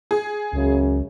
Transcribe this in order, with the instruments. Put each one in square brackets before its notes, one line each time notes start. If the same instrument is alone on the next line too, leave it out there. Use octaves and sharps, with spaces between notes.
[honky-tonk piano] G#4
[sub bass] C#2 [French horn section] F#2 C#3